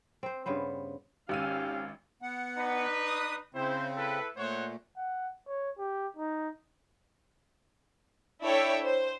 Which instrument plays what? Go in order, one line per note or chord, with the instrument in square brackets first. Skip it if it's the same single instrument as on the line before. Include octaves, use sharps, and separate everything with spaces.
[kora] C4 C5
G2 C#3 B3 C5
[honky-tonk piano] G#1 E6 D#7 [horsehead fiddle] C#4 F5 [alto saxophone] G4
[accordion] B3 F#5
[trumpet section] D4 D#4 B4
[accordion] D#6
[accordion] C#3 C4 [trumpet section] E4 C5
[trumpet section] E4 A4 B4
[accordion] A#2 A3 [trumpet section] C5 C#5 F#5
[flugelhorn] F#5
C#5
G4
D#4
[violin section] D4 E4 A4 C#5 E5 G5
C5